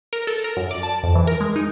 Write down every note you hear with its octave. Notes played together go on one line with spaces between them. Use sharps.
A#4
A4
A#4
F#2
D5
A5
F2
E3
A#4
G#3
D#4